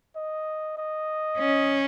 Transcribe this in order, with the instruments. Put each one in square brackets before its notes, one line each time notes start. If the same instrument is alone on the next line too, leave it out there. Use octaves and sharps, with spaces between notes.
[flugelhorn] D#5
D#5
[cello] C#4